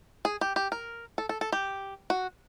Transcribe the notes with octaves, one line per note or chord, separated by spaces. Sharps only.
G#4
G4
G4
A#4
A4
A4
A4
G4
F#4